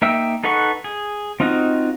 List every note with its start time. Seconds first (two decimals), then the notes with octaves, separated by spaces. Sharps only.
0.02 A#3 D#4 E5 G5 E6
0.44 D#4 A4 B4 F#5 C#6
0.84 G#4
1.40 C4 D#4 F4 F#4 D#5